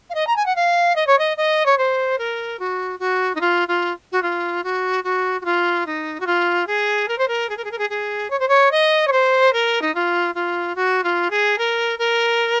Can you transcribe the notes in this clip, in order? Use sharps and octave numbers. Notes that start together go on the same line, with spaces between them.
F5
D#5
A#5
G#5
F#5
F5
D#5
C#5
D#5
D#5
C#5
C5
A#4
F#4
F#4
D#4
F4
F4
F#4
F4
F#4
F#4
F#4
F4
D#4
F#4
F4
G#4
A#4
C5
A#4
G#4
A#4
G#4
A#4
G#4
G#4
C#5
C5
C#5
D#5
C#5
C5
A#4
D#4
F4
F4
F#4
F4
G#4
A#4
A#4